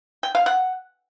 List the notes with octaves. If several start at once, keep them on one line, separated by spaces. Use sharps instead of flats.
G5
F5
F#5